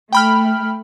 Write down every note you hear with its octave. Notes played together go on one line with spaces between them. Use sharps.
A3 G5 B5 F6